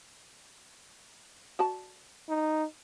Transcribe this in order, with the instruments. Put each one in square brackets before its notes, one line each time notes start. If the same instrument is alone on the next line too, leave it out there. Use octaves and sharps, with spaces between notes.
[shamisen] F#4 D5 A5
[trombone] D#4